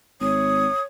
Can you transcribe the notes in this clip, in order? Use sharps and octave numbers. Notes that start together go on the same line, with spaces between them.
G#1 C#5 D#6